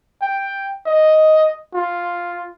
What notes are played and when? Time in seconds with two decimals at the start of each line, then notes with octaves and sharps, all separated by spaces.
0.22 G5
0.86 D#5
1.74 F4